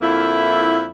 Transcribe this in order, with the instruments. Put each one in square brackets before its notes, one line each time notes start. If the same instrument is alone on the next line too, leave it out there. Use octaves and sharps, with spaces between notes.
[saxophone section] F2 D3 A#3 E4